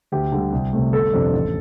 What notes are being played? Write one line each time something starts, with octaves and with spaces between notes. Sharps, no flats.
D2 G4
D3 G3
C2
C3 A3
G1 A4
F2 C3 F3 D4
A1